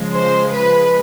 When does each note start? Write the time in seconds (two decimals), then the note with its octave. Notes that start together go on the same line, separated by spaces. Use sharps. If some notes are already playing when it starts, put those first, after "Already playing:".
Already playing: C#3 F3 G#3
0.14 C5
0.52 B4